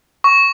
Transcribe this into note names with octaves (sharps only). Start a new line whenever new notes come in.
C#6